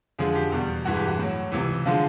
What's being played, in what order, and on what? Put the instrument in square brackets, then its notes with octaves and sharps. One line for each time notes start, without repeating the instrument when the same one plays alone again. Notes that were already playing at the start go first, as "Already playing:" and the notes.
[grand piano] F2 D3 F3 G#3 G#4
G#4
G4
E2 B2 G3
G2 E3 G#3 F#4
G4
F#4
A2 F#3
C#2 C3 E3
D3 F3 G#3 F4